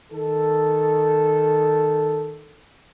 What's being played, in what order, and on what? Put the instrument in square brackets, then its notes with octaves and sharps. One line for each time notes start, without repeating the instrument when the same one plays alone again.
[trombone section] D#3 A4